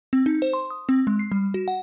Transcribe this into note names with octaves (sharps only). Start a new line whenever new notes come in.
C4
D#4
C5
C6
D#6
C4
G#3
C7
G3
F#4
F#5